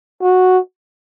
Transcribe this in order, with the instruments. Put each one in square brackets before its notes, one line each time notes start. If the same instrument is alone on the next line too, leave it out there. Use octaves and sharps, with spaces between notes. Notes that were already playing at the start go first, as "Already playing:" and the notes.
[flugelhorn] F#4